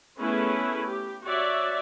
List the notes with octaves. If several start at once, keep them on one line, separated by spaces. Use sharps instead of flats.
A3 B3 C#4 E4 G#4 B4
G4
F#4 C#5 D5 E5